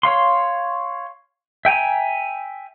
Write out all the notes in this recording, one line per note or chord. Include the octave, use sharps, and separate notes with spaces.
C#5 F5 C6
E5 G5 G#5 A#5